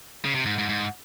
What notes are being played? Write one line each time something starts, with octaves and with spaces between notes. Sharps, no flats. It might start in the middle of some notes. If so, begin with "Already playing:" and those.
C#3
C3
G#2
G#2
G#2